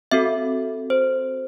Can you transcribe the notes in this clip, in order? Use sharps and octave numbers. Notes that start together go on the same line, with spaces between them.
C4 F#4 A4 E5
C5